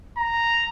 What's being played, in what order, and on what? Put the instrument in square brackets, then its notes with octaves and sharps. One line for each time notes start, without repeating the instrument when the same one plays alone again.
[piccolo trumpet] A#5